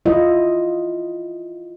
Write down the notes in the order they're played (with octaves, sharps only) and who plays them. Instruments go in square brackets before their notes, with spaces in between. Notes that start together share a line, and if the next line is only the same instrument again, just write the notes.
[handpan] E4 F4 D#5